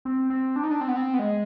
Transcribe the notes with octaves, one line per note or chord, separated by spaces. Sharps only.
C4
C4
D4
D#4
D4
C4
B3
C4
B3
G#3